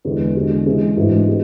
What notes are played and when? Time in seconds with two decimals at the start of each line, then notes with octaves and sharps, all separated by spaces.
0.05 E2 D3 G#3 B3
0.36 E2 D3 G#3 D4 F#4
0.66 C#3 E3 G#3
0.97 G#2 E3 A3 D4 F#4
1.28 G#3 B3 F#4